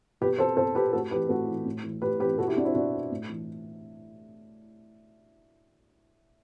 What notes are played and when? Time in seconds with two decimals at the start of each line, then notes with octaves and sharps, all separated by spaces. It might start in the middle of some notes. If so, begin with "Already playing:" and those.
0.21 B2 G4 B4
0.39 A4 C5
0.57 B2 A4 C5
0.75 G4 B4
0.93 A2 F#4 A4
1.11 E3 G4 B4
1.29 A2 F#4 A4
1.47 E3
1.65 A2
1.83 E3
2.02 A2 G4 B4
2.20 E3 G4 B4
2.38 B2 F#4 A4
2.47 E4 G4
2.57 D4 F#4
2.65 C4 E4
2.74 B2 D4 F#4
3.11 A2
3.29 E3